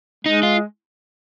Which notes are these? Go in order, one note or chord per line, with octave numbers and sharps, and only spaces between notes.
G#3 D#4
F4